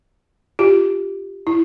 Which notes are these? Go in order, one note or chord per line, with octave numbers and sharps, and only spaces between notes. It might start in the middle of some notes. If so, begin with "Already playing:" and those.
F4 G4
E4